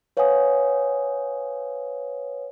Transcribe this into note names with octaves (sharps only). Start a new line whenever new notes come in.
B4 C#5 F5 F#5 G#5 D#6